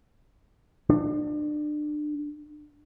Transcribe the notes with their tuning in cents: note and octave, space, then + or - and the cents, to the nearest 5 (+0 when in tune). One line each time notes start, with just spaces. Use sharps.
D4 +30